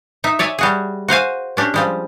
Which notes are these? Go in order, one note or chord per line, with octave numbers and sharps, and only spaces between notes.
D#4 E5
C#5 D5 E5 G#5
G3 F#4 G#4
F#4 C5 F5 G#5
C#4 D4 G4
F3 G3 G#3